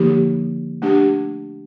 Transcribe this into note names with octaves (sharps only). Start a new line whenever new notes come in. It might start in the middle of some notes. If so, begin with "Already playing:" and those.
Already playing: D3 F3 A#3 D#4 G4
A3 D4 G4